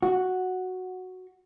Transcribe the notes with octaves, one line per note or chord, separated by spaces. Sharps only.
F#4